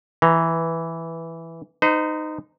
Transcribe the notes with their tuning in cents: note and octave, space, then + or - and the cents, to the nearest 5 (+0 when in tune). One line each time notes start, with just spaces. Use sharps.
E3 +0 A#5 +0
D#4 -10 C5 -45